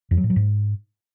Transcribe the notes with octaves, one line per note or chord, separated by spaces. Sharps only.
F2
F#3
A2
F#3
G#2